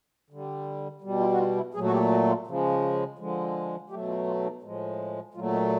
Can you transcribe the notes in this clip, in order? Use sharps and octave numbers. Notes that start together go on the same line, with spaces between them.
D3 G3
B2 G3
F4
F#4
F4
E4
A#2 F#3 A3 G#4
F#4
G4
F#4
F4
C#3 F3 G#3
D3 F3 G#3
B2 F#3 A3 G4
F4
F4
D#4
A2 F3 G#3
A#2 F#3 A3 F4
D#4